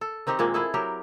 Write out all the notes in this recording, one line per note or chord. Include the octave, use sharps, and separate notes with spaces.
A4
D#3 C4 D#4 G4
A#2 G#3 A#3
E4 G#4 A4
F#3 G4 A#4